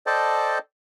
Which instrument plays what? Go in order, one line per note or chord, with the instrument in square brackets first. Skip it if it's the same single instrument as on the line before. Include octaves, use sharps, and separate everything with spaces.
[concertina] A4 C5 D5 D#5 G5 A5